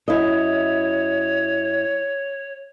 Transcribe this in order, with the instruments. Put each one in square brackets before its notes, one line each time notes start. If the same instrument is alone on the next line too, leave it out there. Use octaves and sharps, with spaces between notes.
[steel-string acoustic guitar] F#2 E4 D#5 [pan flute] C#5